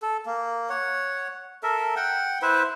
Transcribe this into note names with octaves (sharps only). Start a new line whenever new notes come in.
A4
A#3
C#5 F#5
A4 A#4 E5
F#5 G5
E4 B4 C5 E5